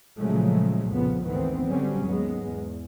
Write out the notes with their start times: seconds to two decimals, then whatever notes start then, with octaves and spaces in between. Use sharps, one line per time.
0.20 A#2 C#3 F3 F#3 G#3 A3
0.91 C2 F2 A#2 C#3 F3 B3
1.24 G#1 D2 D#3 E3 B3 C4
1.69 D3 F#3 G3 C4 C#4
2.05 D#2 G#2 G#3 B3
2.49 E2